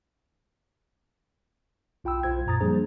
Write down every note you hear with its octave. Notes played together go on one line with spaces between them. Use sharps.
B1 F4 G5 B5 E6
B1 F4 C5 G#6
F#2 A#2 A#5 D#6 A6
F3 G3 A#3 D4 G#4 C5